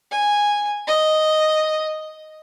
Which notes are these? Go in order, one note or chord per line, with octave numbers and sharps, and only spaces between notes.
G#5
D#5